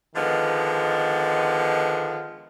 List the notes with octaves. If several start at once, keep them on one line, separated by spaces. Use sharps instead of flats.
D3 D#3 F3 G#3 B3